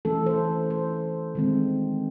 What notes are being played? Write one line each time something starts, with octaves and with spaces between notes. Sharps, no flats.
E3 A3 C#4 A4
C5
C5
D#3 G#3 C4